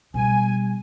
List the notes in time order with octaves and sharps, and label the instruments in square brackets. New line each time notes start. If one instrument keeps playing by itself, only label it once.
[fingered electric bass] B2 [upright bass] G3 [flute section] G#5